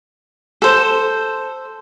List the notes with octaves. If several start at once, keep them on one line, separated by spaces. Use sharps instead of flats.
A4 C5